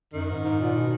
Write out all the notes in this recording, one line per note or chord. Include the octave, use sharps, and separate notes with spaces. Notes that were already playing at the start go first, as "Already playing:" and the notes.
F#2 D#3
G#2
G#2
A#2
B2